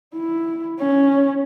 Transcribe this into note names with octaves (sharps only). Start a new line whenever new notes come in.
E4
C#4